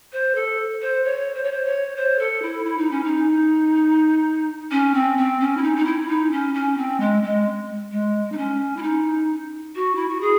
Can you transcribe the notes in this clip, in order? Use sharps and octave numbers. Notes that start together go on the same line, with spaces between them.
C5
A4
C5
C#5
C5
C#5
C5
C#5
C5
A4
E4
E4
D#4
C#4
D#4
C#4
C4
C4
C#4
E4
D#4
D#4
E4
D#4
C#4
C#4
C4
G#3
G#3
G#3
D#4
C#4
E4
D#4
F#4
E4
F#4
G#4